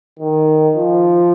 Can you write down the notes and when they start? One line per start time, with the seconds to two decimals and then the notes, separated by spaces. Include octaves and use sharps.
0.19 D#3
0.75 F3